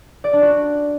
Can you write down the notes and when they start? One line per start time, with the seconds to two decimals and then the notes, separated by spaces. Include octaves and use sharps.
0.24 D5
0.33 D4
0.42 F#4